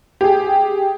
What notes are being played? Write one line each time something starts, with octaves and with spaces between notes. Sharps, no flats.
G4 G#4